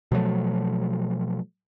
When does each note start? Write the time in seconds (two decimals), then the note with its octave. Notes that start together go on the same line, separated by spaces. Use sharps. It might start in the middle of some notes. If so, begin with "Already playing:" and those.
0.12 B2 F3 F#3 A3